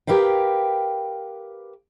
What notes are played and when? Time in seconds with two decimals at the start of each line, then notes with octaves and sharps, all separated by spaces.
0.07 G4 A#4 B4 F5 G5